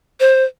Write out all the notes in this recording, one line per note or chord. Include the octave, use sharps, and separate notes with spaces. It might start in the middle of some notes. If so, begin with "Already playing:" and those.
C5